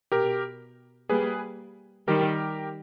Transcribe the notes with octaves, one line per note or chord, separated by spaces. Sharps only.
B2 G4 A#4
G3 A#3 G#4 B4
D#3 G3 G4 A#4